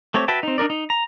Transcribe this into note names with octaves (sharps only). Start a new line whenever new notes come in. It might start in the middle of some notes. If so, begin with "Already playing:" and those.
A3 C4 G4 C#5
F#4 B4 E5 G5 A5
C4 D#4
D4 D#4 A#4 D5
D#4
A#5